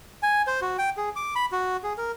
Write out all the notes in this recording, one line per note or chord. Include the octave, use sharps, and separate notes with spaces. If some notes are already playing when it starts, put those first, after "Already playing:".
G#5
C5
F#4
G5
G#4
D6
B5
F#4
G#4
A#4